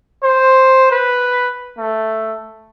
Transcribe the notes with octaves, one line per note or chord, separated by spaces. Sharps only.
C5
B4
A3